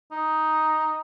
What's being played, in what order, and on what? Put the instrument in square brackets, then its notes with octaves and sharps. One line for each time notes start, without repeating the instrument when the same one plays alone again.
[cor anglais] D#4